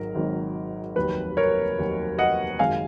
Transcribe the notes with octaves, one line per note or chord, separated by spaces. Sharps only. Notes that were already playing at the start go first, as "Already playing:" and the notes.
Already playing: G#1 G#2 D#3 F#3 A#4
G#1 G#2 D#3 F#3
F1 D#2 D#3 F#3 B4
A#4 C#5
F1 D#2 D#3 F#3
D#5 F#5
G#1 F#2 D#3 G#3 F5 G#5